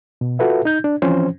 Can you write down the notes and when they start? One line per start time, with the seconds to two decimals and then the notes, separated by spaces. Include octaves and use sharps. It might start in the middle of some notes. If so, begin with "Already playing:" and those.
0.21 B2
0.39 F4 F#4 A4 B4 E5
0.65 D#4 G6
0.84 D4
1.02 E3 F3 C4 C#4 C5